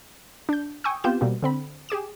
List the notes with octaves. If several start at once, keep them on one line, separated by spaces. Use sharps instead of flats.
D4 G6
G5 G#5 C#6 D#6 E6
B3 C4 F4 G4 G6 E7
B2 G3 A#3 C4
D3 C4 B5
G4 G#4 D6 E7